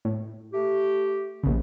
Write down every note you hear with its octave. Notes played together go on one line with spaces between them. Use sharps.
A2
A3 G4
A#1 C#3